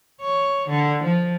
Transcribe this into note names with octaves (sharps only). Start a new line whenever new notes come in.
C#5
D3
F3